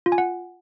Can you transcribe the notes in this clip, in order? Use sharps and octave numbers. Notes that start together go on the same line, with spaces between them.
F4
G#5
F#5